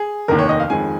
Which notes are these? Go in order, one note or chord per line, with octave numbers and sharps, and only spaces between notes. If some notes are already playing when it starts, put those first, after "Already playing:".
Already playing: G#4
F1 D#2 D#3 A#4
C#5
D#5
F5
F2 D#3 G#3 G#5